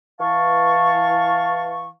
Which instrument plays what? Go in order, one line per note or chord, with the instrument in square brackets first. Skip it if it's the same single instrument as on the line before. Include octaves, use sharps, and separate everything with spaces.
[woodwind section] E3 F5 A5 C#6